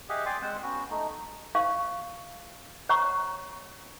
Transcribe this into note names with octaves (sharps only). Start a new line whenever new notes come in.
G4 G#4 D#5 E5 F#5
D5 G5 G#5 C6 D6
G#3 C4 C5 F#5
B3 C#4 F#4
A3 D#4
C5 F5 C#6
C5 C#5 F#5 A#5 C#6